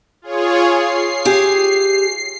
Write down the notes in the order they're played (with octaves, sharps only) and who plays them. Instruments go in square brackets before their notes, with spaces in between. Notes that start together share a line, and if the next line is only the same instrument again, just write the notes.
[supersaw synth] F4 G#4 C#5
C7
[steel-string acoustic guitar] G4 G#4